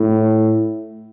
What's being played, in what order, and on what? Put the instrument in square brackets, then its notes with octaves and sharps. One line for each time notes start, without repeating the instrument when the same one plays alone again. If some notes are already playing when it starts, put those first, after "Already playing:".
Already playing: [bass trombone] A2